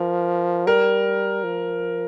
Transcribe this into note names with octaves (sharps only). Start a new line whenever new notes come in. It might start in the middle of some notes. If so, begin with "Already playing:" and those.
Already playing: F3 A#4
G3 A#4
F3